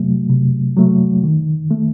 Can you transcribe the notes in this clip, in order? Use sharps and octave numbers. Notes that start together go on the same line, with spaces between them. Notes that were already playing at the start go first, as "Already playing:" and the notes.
Already playing: C3 F#3 A3
C3
F#3 A3
D#3
A3